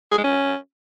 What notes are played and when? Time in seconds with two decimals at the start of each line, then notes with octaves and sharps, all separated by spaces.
0.12 G#4
0.18 G#3
0.24 C#4